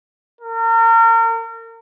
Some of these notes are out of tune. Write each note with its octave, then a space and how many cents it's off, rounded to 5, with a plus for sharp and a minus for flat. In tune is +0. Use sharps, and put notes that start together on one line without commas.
A#4 -35